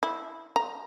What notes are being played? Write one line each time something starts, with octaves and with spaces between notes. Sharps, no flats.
E4
A#5